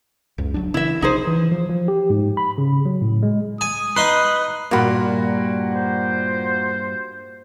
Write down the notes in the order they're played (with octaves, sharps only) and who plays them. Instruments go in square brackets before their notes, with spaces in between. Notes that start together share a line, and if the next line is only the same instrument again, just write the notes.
[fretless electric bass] C#2 F#2
F#1 F#3 D4
[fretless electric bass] C#3 E3 [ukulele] E4 E5
[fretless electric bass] A#1 C3 F3 [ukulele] D#4 G#4 C5
[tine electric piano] E3
F3
F3
G4
G#2
B5
C#3
F#3
A2
G#3
[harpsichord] G#5 [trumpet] D#6
[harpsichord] D#4 C6 [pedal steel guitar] B4
[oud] G2 A#2 [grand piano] A#3 F#4 B5
[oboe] C5